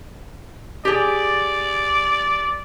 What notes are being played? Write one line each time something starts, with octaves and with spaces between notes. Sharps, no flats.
G4 G#4 D5